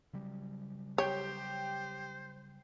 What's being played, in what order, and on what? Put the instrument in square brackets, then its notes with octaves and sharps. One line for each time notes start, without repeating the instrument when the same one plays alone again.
[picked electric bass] C#3 F#3 G3
[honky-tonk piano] G4 G5 [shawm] C5 [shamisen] C#5